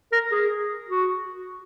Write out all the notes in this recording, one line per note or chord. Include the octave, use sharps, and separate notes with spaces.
A#4
G#4
F#4